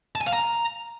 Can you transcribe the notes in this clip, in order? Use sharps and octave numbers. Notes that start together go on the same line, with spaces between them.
A5
G#5
F5
A#5